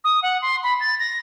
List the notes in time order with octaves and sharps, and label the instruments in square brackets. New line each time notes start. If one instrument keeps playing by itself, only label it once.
[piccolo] D#6
F#5
C6
B5
A6
A#6